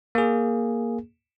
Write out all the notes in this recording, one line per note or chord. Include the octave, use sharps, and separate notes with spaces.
A#3 G#4